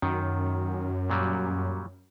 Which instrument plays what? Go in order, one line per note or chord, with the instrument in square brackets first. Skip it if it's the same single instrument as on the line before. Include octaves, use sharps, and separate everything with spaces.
[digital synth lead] F#2 [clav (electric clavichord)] D#3
[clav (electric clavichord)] A#2 F#3 G3